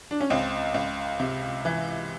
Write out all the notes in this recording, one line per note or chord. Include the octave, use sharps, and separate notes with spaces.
D4
C#4
C#2 C4
C#2
C3
E3